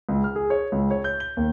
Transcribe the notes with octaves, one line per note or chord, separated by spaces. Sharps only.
C#2
F6
G#4
C#5
C#2
C#5
G6
G7
D#2